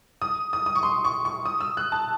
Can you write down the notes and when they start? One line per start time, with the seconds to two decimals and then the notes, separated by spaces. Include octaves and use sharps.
0.22 D#6
0.53 D#6
0.66 D#6
0.75 C#6
0.83 C6
1.05 C#6
1.25 C#6
1.45 D#6
1.61 E6
1.77 F#6
1.92 A5